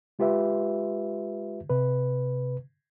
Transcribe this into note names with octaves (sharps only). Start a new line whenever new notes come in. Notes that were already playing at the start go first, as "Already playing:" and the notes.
G#3 F4 G4 B4 E5
C3 B4